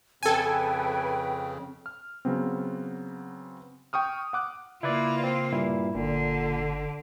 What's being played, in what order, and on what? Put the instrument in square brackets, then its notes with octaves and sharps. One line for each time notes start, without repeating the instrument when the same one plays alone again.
[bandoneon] F2 C#3 [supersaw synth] A4 G#5 [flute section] B4 G5
[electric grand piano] F6
C#3 F#3 B3 C4
G5 C#6 D#6 F6
F#5 D6 F#6
[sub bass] C#3 [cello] A#3 F4 [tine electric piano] E4 B4 D5
[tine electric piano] C4
G2 A#2 E4
[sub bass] G1 [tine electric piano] A#2 [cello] D3